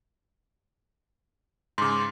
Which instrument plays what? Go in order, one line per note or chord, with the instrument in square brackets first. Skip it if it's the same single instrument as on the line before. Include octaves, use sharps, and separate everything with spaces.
[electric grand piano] G#2 C#3 [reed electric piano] C6 D6